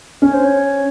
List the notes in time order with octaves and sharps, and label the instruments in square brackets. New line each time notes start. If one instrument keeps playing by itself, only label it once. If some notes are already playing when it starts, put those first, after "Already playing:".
[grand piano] C#4 [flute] C#5
[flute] C5
C#5